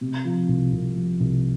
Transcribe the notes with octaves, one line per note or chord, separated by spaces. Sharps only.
C3
F3
C2
C2
F3
C2